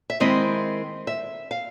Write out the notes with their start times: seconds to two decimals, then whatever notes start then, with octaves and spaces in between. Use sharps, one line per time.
0.10 E5
0.20 D#3 G#3 C4 E4 D#5
1.07 E5
1.51 F5